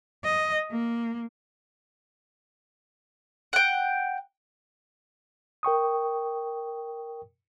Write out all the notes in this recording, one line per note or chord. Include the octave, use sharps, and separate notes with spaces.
D#5
A#3
F#5 G5
A#4 G5 C#6 D#6